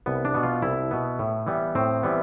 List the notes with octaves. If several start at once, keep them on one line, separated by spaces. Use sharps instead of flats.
C2 B3
D4
B2 B3
F4
C2 E4
B2 B3
A2
E3 G3 B3
A2 C4
E3 G3 B3